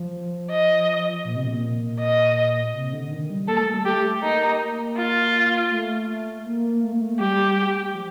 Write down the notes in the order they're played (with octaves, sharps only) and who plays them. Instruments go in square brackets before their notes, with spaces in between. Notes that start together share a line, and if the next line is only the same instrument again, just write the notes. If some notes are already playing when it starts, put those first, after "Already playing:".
Already playing: [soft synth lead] F3
[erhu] D#5
[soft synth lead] A#2
C3
A#2
[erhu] D#5
[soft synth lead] C3
D3
D#3
G3
[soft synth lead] A#3 [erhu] A4
[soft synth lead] A3
G3
[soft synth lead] A3 [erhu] G4
[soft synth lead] A#3 [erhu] D#4
[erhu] F4
[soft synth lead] A3
A#3
A3
A#3
A3
[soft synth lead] G3 [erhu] G4
[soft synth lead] G3
F3